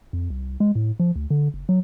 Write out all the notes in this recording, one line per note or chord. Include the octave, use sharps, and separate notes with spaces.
F2
C2
G#3
A2
F3
D2
D3
F#1
F#3